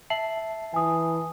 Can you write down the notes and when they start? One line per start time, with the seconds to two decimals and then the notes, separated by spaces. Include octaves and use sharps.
0.10 E5 A5 C7 F#7
0.74 E3 G#5 D#6